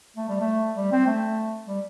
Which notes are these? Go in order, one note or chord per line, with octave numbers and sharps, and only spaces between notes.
A3
G3
A3
G3
C4
A3
G3